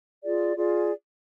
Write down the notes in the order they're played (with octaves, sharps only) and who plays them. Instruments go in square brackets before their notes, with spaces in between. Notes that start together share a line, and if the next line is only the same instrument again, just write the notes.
[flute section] F4 G#4 D5
F4 G#4 D5